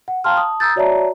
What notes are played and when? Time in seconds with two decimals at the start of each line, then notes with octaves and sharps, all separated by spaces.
0.08 F#5
0.24 F5 G5 A5 A#5 C6 F6
0.37 A5 D#6
0.60 A#5 D#6 E6 G6 A6
0.76 F#4 C#5 D5 E5 A5 A#5